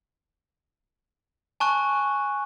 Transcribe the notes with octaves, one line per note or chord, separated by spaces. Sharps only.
G#5 A5 C#6 F#6